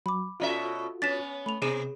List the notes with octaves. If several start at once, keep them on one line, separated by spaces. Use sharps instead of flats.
F#3 B5 D6
B2 C#4 F4 F#4 A4 E5
B3 C#4 A6 B6 E7
A3 B5 F7
C3 B3 G#4 D#7 E7